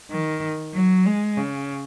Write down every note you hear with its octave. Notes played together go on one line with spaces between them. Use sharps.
D#3
F#3
G#3
C#3